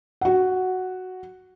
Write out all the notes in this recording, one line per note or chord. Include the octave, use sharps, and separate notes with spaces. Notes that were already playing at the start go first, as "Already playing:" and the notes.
F#4 F#5